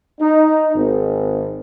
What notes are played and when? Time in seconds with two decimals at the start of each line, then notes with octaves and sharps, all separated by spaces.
0.21 D#4
0.74 G#1